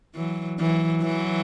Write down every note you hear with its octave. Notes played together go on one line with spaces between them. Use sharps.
E3 F#3
E3 F#3
E3 F#3